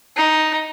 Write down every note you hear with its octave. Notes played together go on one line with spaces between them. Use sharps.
D#4